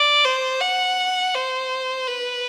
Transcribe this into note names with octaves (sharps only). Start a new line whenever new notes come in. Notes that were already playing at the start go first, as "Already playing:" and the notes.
Already playing: D5
C5
F#5
C5
B4